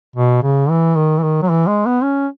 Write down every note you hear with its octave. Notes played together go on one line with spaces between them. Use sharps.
B2
C#3
E3
D#3
E3
D#3
F#3
E3
G#3
B3
C#4